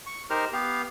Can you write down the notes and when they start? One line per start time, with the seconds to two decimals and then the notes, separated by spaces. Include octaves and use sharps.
0.06 C#6
0.30 D#4 G4 A#4 C5 F6
0.53 B3 G4 F5